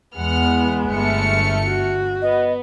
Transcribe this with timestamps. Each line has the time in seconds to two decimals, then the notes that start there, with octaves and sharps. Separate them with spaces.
0.17 E2 G#3 B3 F#5 F6
0.93 G1 A3 F6 C#7
1.67 F#4
2.22 B3 D#5